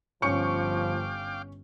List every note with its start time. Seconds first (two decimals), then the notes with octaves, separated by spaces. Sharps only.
0.22 G1 F3 C#4 F5 G5 C#6 D6 C#7